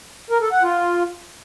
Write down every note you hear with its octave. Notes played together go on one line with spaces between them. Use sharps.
A#4
A4
F#5
F4